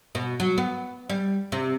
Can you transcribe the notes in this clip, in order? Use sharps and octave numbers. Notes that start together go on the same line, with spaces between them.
B2
F#3
B3
G3
C3